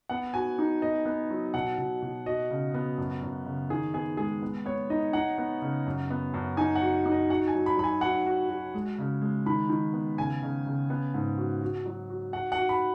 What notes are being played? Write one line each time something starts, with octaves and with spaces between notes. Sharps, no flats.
B3 F#5
F#4 G#5
D#4
B3 D#5
B3
F#3
B2 F#5
B2
B2
F#4 D#5
C#3
B3
F#2
F#2
C#3
D#3 G#4
B3 G#4
G#3 G#4
B3
B3 C#5
D#4 D#5
D#4 F#5
B3
C#3
F#2
B3
F#2
D#4 G#5
F#5
F#4
D#4
D#5
F#4 F#5
G#5
F#3
B5
F#3 B5
G#5
F#4 F#5
F#4
F#4
G#3
C#3
G#3
D#3 B5
D#3
B3
C#3 G#5
C#3
C#3
B3
G#2
F#4
F#4
F#3
F#4
F#4 F#5
F#5
F#4
B5